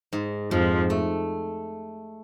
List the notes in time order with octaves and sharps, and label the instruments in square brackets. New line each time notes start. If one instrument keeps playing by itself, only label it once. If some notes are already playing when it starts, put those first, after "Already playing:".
[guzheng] G#2
[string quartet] F2 F3 [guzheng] G#2
[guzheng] A3